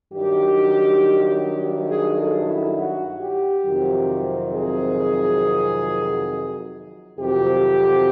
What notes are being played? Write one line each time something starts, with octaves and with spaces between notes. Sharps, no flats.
G2 D#3 F#3 G4
G#4
A4
E4
F#4
G4
F2 C3 D#3 F#3
G#4
F2 C3 D#3 F#3 G4